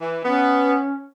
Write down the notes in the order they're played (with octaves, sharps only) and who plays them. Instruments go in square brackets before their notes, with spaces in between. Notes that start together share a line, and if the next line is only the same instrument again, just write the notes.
[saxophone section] E3
[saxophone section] B3 [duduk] C#4